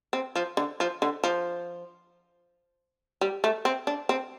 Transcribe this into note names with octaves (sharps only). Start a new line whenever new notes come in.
C4
F3
D3
F3
D3
F3
G3
A3
C4
D4
C4